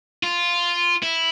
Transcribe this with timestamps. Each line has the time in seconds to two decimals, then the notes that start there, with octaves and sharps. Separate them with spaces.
0.23 F4
1.03 E4